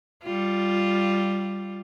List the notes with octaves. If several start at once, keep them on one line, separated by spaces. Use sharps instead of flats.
G3 F4